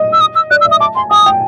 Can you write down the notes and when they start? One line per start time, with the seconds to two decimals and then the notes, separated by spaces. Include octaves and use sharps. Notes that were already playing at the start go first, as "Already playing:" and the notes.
Already playing: D#5
0.13 E6
0.21 D#6
0.35 E6
0.51 D5 F#6
0.61 E6
0.65 E5
0.71 D#6
0.80 A5 D6
0.96 G#5 C6
1.11 G#5 D#6
1.26 G5